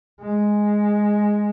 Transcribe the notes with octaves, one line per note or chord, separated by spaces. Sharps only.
G#3